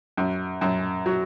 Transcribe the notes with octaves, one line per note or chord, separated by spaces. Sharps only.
F#2
F#2
F#3